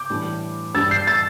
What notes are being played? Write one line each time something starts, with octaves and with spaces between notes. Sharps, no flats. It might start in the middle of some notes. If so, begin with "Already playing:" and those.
Already playing: D6 G6
A2 E3 G3 D4
G2 G3 D4 E6 A6
G6 C7
E6 A6